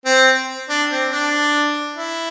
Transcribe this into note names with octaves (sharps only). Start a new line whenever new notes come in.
C4
D4
C4
D4
E4